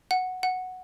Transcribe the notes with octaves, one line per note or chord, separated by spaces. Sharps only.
F#5
F#5